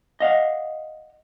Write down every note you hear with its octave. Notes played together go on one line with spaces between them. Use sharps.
D#5 F5 F#5